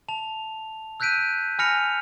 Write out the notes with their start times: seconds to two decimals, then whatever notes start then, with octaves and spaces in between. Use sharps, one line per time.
0.08 A5 F7
1.00 E6 F#6 G6 B6 D7 D#7
1.59 G#5 B5 F6 A#6 C#7 F7